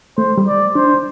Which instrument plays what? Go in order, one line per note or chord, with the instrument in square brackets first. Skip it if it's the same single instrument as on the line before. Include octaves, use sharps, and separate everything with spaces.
[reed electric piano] A3 [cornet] C5
[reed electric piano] G3
[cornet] D5
[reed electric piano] D4 [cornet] C5